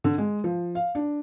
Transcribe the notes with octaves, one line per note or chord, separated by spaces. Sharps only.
D3
G#3
F3
F5
D4